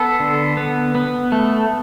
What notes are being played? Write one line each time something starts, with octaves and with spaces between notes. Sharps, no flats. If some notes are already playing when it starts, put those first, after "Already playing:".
Already playing: B3 A4
D3
B3
B3
A3